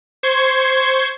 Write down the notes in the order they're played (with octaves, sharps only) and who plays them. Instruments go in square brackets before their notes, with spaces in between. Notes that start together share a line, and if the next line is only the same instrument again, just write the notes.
[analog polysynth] C5 C6 C#6 G#6